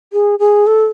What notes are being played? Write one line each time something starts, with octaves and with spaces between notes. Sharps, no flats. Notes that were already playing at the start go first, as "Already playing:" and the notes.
G#4
G#4
A4